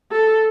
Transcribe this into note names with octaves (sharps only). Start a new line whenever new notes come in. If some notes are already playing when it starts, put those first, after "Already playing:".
A4